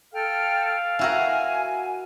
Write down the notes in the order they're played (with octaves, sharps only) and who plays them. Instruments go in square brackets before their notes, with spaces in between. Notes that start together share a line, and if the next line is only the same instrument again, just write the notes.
[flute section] A4 G5 F6 [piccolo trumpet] F5
[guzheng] E4 F#4 A#4 [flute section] G#5